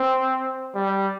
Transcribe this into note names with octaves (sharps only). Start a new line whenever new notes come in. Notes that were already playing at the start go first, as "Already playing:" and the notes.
Already playing: C4
G3